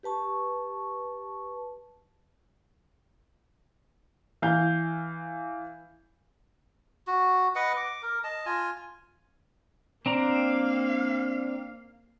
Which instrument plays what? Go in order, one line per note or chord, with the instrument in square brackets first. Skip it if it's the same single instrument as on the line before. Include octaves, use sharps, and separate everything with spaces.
[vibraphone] G4 B4 A5 C#6
[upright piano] E3 F5 G6
[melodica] F#4
B4 D#5 F#5
D6
A#4
D#5 A5
F4 G#5
[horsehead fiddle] A#3 F5 [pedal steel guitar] C4 D4 A#5